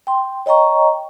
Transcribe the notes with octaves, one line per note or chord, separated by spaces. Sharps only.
G5 C6
C#5 D#5 G5 A#5 C#6